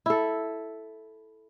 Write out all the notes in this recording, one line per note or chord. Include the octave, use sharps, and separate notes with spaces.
E4 A4